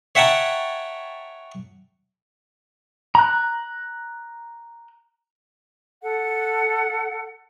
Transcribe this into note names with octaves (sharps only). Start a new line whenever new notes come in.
C#5 E5 F#5 G5 A5 A#5
A#5 F#6
A4 F#5